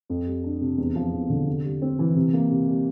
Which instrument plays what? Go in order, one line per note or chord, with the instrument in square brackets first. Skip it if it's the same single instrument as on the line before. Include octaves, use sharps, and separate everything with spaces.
[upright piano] F2
G3
D4
C3
E2
F3
E2
D3
C3
G3
C4
E3
C3
A#3
C3
G3